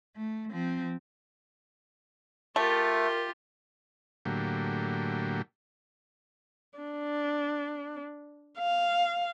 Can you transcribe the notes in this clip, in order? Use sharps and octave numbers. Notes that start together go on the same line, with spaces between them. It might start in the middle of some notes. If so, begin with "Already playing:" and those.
A3
F3 C4
A3 F4 G4 A#4
A2 D3 F#3 A#3 G4
D4
F5